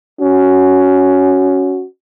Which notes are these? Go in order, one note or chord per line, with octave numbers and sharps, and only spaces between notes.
C#4 F#4